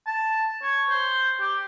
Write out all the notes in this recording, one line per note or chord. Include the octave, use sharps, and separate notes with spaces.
A5
C#5
C5
G4